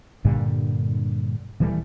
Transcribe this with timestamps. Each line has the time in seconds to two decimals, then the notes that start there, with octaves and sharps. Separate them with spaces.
0.25 G2 A#2 D3 G3
1.60 D#1 E3 G3 A3